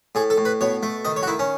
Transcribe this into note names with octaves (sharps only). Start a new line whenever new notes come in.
A2 G#4
A4
A2
B4
B2 C#5
A3
D#3 D#5
C#5
F#4
D#3 E4
C#4